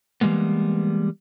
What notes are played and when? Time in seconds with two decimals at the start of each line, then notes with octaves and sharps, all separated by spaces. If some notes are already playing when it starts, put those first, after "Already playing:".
0.21 E3 G3 G#3 A#3 B3